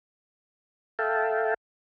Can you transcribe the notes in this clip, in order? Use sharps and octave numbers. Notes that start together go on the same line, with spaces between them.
A4 E5 F5 G5 A5